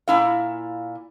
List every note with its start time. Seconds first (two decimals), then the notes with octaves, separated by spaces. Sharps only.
0.08 A#2 E4 F5